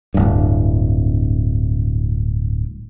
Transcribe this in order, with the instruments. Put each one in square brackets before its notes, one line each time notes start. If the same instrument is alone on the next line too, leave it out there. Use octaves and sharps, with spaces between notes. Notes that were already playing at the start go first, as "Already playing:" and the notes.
[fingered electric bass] D1 G2